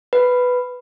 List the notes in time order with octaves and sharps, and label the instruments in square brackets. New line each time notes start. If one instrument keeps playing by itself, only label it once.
[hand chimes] B4